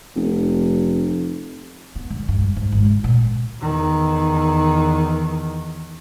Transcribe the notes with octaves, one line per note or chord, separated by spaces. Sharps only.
F1
B3
D3
G2
G3
G#2
G#1
D3
A#2
E2 D#3